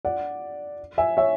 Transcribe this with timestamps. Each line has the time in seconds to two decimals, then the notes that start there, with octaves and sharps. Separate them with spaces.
0.05 D5 F#5
0.98 E5 G#5
1.17 C#5 E5